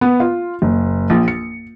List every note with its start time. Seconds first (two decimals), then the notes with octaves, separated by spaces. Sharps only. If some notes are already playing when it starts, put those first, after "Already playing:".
0.01 B3
0.20 F4
0.62 F#1
1.10 A#1
1.28 C#7